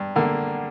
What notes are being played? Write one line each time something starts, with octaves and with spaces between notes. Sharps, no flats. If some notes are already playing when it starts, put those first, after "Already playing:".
Already playing: G2
D3 A#3